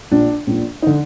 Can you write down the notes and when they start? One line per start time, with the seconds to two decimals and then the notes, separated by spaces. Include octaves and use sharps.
0.11 A#1 A#2 D4
0.47 A#1 A#2
0.82 D#4
0.87 D3